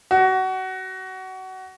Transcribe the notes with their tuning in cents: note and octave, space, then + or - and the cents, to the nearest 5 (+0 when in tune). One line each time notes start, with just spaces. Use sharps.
F#4 +25